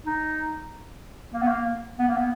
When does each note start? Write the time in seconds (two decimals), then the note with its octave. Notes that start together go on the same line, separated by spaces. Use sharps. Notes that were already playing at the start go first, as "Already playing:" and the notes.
0.06 D#4
1.34 A#3
1.42 B3
1.48 A#3
1.99 B3
2.08 A#3
2.17 B3